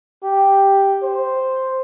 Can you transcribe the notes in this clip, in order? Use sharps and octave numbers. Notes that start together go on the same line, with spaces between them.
G4
C5